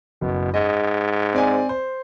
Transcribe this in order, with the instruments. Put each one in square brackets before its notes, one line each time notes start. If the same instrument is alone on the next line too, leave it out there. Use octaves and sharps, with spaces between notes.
[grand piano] F#1 [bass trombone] B2
[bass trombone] G#2 [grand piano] D#5
[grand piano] C4 D5 G#5
C5